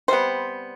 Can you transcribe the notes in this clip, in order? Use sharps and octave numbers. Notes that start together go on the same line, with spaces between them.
C3 G3 B3 C5